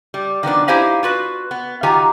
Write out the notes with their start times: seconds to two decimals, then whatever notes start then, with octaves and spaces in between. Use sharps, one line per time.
0.14 G3
0.43 D#3 F3 B3 D4
0.68 D#4 E4 G4 C5 F5 G#5
1.03 F4 F#4 B4
1.51 B3
1.83 D#3 F#3 F4 G4 G#5 A#5